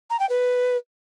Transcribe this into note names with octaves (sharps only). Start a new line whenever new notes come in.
A#5
G5
B4